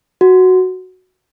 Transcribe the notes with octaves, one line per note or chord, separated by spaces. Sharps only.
F#4